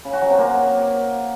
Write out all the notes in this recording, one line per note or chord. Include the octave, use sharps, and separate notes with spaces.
C#3
F#4
F#3
C3
A#3